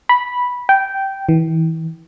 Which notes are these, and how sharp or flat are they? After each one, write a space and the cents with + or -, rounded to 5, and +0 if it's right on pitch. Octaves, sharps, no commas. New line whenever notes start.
B5 -10
G5 -10
E3 -30